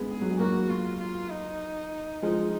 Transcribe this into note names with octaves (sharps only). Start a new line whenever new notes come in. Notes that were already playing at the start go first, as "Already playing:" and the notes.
Already playing: G#3 B3 C#4
G#4
F#3
G#3
F#3 A#3 F#4
F4
F4
D#4
F3 G#3 D#4